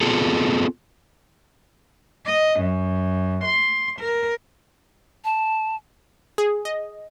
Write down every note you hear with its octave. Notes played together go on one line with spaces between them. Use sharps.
B3 C4 F4 G#4 A4
D#5
F#2
C6
A#4
A5
G#4
D#5